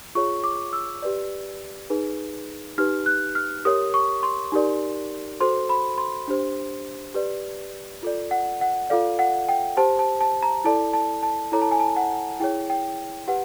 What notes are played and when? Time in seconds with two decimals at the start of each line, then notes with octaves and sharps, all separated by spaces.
0.15 F4 G#4 C#5 C#6
0.44 D6
0.73 E6
1.02 G4 B4 D5
1.90 D#4 G#4 B4
2.78 D#4 G4 B4 F6
3.06 F#6
3.35 F6
3.65 G4 A#4 C#5 D#6
3.94 C#6
4.23 C6
4.52 D#4 G4 A#4 D5
5.40 F#4 A4 C5 C6
5.69 B5
5.98 C6
6.28 D4 G4 C5
7.14 G4 B4 D5
8.03 F4 A4 D5
8.31 F#5
8.61 F#5
8.90 F4 A4 D5 F5
9.19 F#5
9.49 G5
9.77 G4 C5 A5
9.99 A5
10.21 A5
10.43 A#5
10.64 E4 A4 D5 A5
10.93 A5
11.23 A5
11.52 E4 A4 C#5 A#5
11.62 A5
11.71 G#5
11.80 A5
11.96 F#5
12.40 E4 G#4 C#5 G5
12.70 G5
13.28 G4 B4 F#5